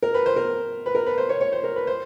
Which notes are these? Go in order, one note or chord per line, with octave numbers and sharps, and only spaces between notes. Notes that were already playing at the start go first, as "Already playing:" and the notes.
A#4
B4
C5
A#4
B4
A#4
B4
C5
C#5
C#5
C5
A#4
B4
C5